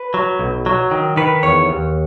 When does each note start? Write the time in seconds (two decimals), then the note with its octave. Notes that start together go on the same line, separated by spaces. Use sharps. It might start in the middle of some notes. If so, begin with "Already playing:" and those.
Already playing: B4
0.14 F#3
0.39 B1
0.66 F#3
0.91 D#3
1.17 D#3 B4
1.43 E2 C#5
1.69 D#2